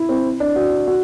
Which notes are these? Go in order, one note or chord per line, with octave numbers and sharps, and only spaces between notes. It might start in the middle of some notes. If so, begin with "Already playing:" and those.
Already playing: E4
C4
D4
F#4
F#4